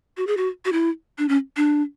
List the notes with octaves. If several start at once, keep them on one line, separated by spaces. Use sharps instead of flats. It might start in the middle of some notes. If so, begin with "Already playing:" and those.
F#4
G#4
F#4
F#4
E4
D4
C#4
D4